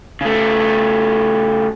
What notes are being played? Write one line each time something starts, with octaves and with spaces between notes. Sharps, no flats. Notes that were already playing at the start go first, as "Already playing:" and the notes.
C#3 A3